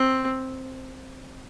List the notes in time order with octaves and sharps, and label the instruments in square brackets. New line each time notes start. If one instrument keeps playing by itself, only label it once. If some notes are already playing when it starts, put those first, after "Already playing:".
Already playing: [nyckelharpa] C4